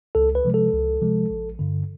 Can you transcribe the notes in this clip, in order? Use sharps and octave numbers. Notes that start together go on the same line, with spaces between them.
C#2 A4
B4
C3 F3 G#3
A4
C#2
C3 F3 G#3
A1
G2 D3